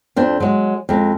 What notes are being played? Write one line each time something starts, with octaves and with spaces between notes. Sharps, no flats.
F2 D4 C5
F#3 G#3
F2 G#3